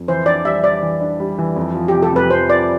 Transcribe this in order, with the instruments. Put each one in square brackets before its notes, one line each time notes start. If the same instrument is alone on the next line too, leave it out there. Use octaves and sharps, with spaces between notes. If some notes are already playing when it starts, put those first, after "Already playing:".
Already playing: [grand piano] F2
[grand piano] E3 [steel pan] C5
[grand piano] D4 [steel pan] D5
[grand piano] G3 [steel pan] E5
[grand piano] E3 [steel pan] D5
[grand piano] E3
D4
G3
E3
F2
F3
[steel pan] G4
[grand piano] C3
[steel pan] A4
[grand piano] F2 [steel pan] B4
[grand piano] F2 [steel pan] C5
[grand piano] F3 [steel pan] D5